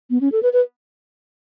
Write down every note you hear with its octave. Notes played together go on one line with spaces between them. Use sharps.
B3
C#4
A4
B4
B4